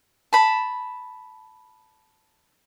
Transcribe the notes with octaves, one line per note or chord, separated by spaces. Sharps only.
A5 B5